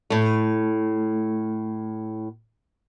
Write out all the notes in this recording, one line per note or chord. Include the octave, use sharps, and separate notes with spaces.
A2 A3